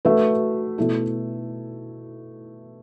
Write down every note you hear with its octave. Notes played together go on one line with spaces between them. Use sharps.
A3 F#4 B4 E5
B2 A3 E4 A4